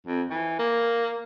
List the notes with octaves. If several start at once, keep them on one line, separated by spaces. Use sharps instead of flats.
F2
E3
A#3